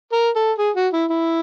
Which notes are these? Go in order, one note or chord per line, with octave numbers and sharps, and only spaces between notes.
A#4
A4
G#4
F#4
E4
E4